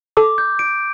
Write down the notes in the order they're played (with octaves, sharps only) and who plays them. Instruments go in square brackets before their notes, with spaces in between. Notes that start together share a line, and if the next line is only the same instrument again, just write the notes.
[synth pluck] A4 [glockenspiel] D6
[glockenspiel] G6
D7